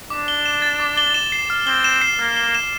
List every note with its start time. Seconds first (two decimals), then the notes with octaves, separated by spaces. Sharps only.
0.10 D4 D6
0.28 G7
0.46 E7
0.62 A6
0.80 D6
0.97 G7
1.14 E7
1.32 C7
1.50 F6
1.67 C4 G7
1.84 E7
2.01 C7
2.19 A#3 F6
2.37 G7
2.55 E7